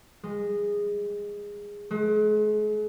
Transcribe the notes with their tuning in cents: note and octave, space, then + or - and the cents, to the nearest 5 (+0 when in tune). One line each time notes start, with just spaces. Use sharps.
G#3 -15
G#3 +40